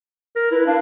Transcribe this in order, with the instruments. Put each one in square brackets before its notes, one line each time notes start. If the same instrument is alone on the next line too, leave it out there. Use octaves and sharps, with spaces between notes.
[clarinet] A#4
[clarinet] E4 [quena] B4
[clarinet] D4 [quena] F5